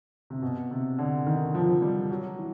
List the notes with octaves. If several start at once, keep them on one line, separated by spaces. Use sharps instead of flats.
C3
B2
C3
D3
D#3
F3
G3
F#3
E3